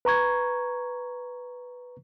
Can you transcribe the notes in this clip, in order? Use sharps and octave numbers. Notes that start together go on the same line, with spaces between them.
B4 A#5 C#6 G#6